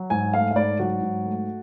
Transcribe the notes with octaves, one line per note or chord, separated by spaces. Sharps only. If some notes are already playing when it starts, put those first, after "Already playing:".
Already playing: F#3
G#2 G#5
A3 F5
F5
G#2 D5
F#3 F#4
G#2
A3